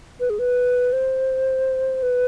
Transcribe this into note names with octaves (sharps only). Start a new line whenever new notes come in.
B4
G#4
B4
C5
B4